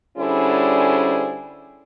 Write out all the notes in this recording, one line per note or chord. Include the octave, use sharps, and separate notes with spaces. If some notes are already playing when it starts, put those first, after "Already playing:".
D3 G3 C#4 E4 G#4 C5